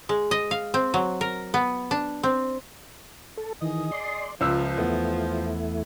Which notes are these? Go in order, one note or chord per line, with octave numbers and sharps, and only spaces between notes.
G#3
D#5
F5
C4
F#3
A#4
B3
D4
C4
A4
D#3 E3 G#4 D#5
D5 C6
C#2 F3 E5 E6
E2 A3 B3 E4